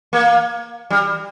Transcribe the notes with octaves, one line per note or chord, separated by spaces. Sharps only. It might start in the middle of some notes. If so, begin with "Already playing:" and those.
A#3
G3